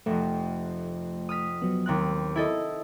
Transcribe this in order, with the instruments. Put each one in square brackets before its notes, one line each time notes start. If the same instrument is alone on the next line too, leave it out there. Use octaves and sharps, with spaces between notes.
[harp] F1 F2 [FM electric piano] A3
[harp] D#6 F6 B6
[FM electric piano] F#3 B3
[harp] D#2 C4 F#6
E4 A4 D#5